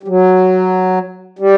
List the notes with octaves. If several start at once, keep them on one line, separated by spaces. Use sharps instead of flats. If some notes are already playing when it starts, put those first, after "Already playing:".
G3
F#3
G3